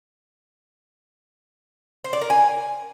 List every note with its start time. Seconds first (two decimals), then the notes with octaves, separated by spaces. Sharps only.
2.04 C5
2.13 D5
2.21 A#4
2.30 G#5